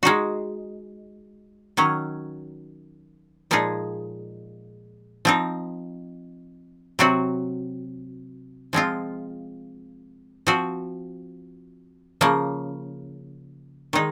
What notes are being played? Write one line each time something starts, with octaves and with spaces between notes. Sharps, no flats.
G#3 D#4 F#4
D#3 F#3 C#4
A#2 F3 G#3 D#4 G#4
F3 C4 D#4
C3 F#3 C4 F#4
F3 G#3 C4 F4
F3 C4 F#4
C#3 F3 A#3
D#3 G#3 D#4